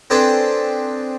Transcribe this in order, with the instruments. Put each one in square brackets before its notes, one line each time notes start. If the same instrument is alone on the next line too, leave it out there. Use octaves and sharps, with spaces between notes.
[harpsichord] C4 D4 G#4 A4 B4